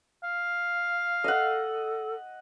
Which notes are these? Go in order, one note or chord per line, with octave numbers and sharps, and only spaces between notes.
F5
A4 D#5 F#5